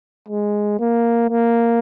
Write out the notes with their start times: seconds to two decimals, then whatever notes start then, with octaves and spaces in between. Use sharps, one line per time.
0.28 G#3
0.79 A#3
1.30 A#3